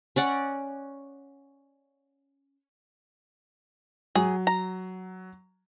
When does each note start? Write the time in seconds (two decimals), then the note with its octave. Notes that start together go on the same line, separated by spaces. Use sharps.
0.16 C#4 D5 F#5
4.15 F#3 G#4
4.47 A#5